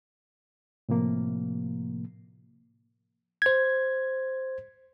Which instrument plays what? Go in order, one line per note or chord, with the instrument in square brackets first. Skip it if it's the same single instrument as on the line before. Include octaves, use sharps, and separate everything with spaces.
[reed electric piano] A2 C3 F3 A#3
[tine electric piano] C5 G#6